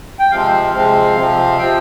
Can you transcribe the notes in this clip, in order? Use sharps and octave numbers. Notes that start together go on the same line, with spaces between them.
G5
C3 F3 G#3 C4 F5
C3 F3 G#3 C4
C3 F3 C4
C3 F3 C4 G5